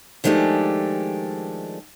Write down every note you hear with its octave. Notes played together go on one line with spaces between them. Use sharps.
D#3 F3 G#3 A3 D4 G4